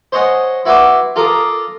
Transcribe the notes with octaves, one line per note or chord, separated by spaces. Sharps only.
C5 C#5 D#5 F#5 G#5
E4 F#4 B4 C6 D6
F4 A4 A#4 F5 D6 D#6